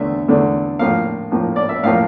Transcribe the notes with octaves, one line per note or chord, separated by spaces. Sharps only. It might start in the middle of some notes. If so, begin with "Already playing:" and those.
Already playing: E2 D3 A3 E5
E2 D3 A3
A2 F3 A#3 F5
A2 F3 A#3
D5
E5
A2 F3 A#3 F5